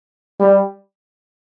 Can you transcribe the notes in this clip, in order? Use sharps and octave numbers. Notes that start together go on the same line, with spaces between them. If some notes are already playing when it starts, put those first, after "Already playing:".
G3